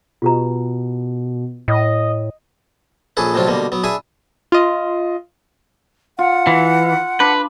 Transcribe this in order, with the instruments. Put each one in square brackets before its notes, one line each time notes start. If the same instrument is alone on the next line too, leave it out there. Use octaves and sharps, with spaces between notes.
[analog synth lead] B2 [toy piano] F4 G4 A#5
[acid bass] A2 [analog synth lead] D#5
[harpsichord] A#1 C#4 G#4 A4 B4
F2 A2 C3 F#3 D4 F4
B2 D3 G3 A#3
F#3 B3
D4 G#4 E5 G#5 B5
[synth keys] F4 D#5
[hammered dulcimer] F4 [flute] F#5
[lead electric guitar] E3
[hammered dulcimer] D4 [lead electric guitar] B4